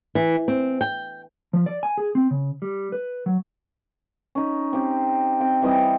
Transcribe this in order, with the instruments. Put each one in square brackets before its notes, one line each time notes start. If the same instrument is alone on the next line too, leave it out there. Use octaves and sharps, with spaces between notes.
[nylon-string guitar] E3
C4
G5
[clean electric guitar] F3
D5
G#5
G#4
C4
C#3
G3
B4
F#3
[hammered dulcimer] C#4 D#4
C4 G4
C4 G5
E3 G3 C4 D#5